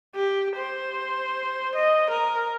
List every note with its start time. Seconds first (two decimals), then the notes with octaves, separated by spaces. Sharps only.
0.15 G4
0.56 C5
1.75 D#5
2.10 A#4